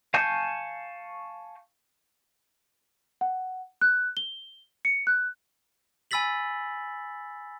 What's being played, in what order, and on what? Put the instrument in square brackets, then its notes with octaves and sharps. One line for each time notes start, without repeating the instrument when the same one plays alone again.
[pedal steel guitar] F5 G#5 A5 C#6 G6
[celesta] F#5
F#6
G7
C#7
F#6
[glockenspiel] G#5 B5 E6 A6 B6 F#7